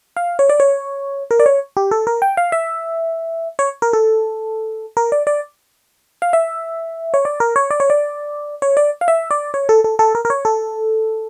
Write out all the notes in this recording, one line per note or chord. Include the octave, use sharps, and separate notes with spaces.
F5
C#5
D5
C#5
A#4
D5
C#5
G4
A4
A#4
G5
F5
E5
C#5
A#4
A4
A#4
D5
D5
F5
E5
C#5
D5
A#4
C#5
D5
C#5
D5
C#5
D5
F5
E5
D5
C#5
A4
A4
A4
A#4
A#4
C#5
A4